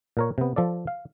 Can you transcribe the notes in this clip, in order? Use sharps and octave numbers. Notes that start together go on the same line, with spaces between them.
A#2 A#4 C#5
C3 B3
F3 A4 D5
F5